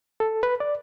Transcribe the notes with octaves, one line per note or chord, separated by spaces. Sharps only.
A4
B4
D5